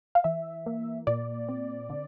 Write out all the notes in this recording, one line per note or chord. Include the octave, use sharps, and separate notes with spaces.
F5
E3 E5
A#3
A#2 D5
C4
D3